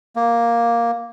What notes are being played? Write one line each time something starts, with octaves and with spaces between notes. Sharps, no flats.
A#3